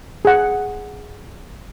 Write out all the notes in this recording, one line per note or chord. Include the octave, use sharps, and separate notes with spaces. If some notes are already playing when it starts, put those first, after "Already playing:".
G#4 F#5